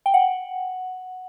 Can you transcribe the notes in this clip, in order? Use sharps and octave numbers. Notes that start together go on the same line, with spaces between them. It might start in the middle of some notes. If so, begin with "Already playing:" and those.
G5
F#5